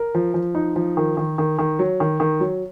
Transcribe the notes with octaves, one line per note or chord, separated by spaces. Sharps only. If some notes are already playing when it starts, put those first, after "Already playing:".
Already playing: A#4
F3
F3
D#4
F3
D#3
D#3
D#3
D#3
F#3
D#3
D#3
F#3